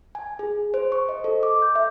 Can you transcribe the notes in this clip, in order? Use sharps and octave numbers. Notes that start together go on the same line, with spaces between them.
G#5
G#4
C5
C#6
D#5
A4
D6
G6
E5